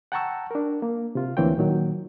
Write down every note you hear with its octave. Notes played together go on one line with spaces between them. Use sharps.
F#5 G5 A5 A#5 C#6 E6
D4 A#4
A#3
C3 F4
D2 E3 A#3 C4 C#5 G5
A#2 D#3 F#3